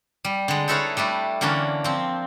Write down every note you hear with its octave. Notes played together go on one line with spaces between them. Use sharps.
G3
D3 G#3
D#4 E4 A4 B4 C#5 F5
G3 A3 D4 E4
D3 E3 A#3 C#4 D4
F3 C4